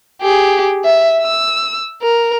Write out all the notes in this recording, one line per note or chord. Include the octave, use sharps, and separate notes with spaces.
G4 G#4
E5
E6
A#4